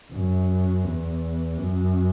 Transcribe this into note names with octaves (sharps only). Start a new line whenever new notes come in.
F#2
E2
F#2